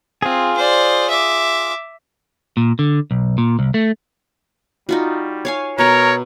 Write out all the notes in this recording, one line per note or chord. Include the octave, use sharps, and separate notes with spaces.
C4 F4 G#4
C5 D5
E5 D6
A#2
D3
B1
A#2
C2
A3
G3 D#4 F4 F#4
C#5 F5 G#5
B2 A#4 C#5 F#5 A#5